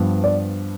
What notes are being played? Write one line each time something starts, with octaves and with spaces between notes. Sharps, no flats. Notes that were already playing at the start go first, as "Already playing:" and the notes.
Already playing: G2 F3 B3
D5